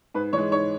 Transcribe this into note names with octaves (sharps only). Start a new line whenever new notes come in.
G#2 B4
E3 G#3 C#5
G#2 C#5